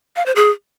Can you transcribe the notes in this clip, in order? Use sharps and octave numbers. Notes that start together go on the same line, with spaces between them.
F5
C5
G#4